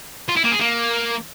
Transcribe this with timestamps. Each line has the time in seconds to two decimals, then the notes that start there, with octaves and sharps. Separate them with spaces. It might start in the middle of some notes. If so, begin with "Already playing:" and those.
0.28 F4
0.36 E4
0.44 A#3
0.52 G#4
0.60 A#3